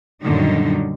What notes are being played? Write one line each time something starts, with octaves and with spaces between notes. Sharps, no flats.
F#2 A#2 D3 D#3 G3 D#4